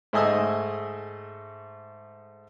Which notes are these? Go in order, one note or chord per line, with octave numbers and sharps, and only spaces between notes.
G#2 A3 D#5 G#5 D#6 E6